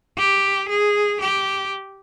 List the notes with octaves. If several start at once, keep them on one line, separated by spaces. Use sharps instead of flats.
G4
G#4
G4